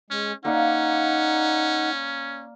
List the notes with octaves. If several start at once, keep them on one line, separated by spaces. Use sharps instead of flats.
G#3 C#4
A#3 C#4 D#4 D5 F5 F#5